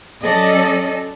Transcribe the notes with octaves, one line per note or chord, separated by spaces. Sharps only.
F#3 C#4 A4 D5 D#5